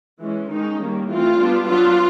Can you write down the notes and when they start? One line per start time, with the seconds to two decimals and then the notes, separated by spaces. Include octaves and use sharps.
0.21 E3 G#3 C#4
0.50 D#3 G#3 C#4 D#4
0.80 D#3 G3 A#3 C#4
1.09 E3 A3 C4 F4
1.38 G3 B3 D4
1.68 F#3 B3 D4 F4